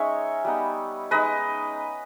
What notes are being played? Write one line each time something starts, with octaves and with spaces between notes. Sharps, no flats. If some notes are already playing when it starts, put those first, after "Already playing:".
Already playing: G#3 C#4 D#4 C#5 E5
G3 B3 D#4
G#3 D#4 B4 D#5